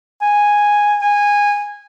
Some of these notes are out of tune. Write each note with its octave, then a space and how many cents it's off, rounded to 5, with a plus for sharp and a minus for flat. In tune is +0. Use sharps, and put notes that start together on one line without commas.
G#5 -5
G#5 -15